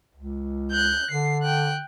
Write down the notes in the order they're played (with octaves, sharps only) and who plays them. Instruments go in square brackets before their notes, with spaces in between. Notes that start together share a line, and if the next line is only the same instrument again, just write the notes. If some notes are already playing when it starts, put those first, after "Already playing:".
[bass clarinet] C#2
[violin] F#6 G6
[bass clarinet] D3 [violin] C7
[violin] G5 F#6